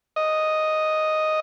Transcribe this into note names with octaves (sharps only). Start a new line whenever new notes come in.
D#5